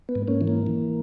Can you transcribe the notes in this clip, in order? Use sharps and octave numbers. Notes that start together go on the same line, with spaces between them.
B3
G#2
A#3 C#4
E3
A#3
E3